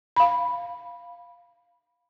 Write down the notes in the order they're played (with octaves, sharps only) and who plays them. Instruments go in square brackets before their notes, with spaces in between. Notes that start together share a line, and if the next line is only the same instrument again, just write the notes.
[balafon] F5 B5